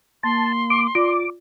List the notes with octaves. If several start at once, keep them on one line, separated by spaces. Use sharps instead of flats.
A#3 A5 C6
D6
F4 D5 D6